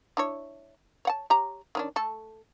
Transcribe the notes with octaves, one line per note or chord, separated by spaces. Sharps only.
D4 E4 C#5
C#5 F#5 A5
G4 C#5 A#5
D#3 C#4 D4
A3 A4